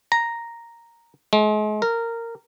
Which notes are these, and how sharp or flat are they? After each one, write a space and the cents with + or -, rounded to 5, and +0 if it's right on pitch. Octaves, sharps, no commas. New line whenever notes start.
A#5 +0
G#3 +40
A#4 -15